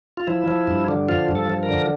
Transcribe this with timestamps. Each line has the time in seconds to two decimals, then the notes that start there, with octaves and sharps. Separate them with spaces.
0.17 F4
0.27 F3 E4
0.48 F3
0.67 G2
0.88 D3
1.09 F3 F4
1.29 G2
1.35 A4
1.50 F3
1.63 A#4
1.69 D3